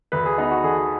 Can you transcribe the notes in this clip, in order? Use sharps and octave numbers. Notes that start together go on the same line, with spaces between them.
D2 B4
G#4
B3 D#4
F#4
D3 G#4